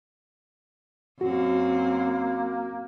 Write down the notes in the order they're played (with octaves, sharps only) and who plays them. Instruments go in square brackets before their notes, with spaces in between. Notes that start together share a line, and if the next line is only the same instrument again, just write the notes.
[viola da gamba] F#2 C4 [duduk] A#3 [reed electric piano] F#4